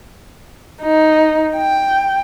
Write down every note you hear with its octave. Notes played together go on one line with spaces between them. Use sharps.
D#4
G5